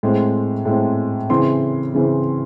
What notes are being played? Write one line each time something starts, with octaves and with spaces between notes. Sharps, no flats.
A2 G#3 C4
A2 G#3 C4
C#3 E3 C4 C6
C#3 E3 C4